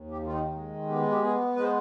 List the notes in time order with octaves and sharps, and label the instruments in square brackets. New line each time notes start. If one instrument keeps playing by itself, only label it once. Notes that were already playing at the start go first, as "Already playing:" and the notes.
Already playing: [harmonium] D#2
G4
D#3 F4
D#4
G#3
B3 G4
G4
B3 G#4
G#3 B4
C5